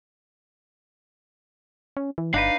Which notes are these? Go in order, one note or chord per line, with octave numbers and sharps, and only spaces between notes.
C#4
E3
G1 D4 D#4 B4 F5